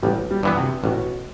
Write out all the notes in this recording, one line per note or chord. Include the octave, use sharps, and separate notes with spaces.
A1 G3
G3
G2 E3 B3
C3
A1 B2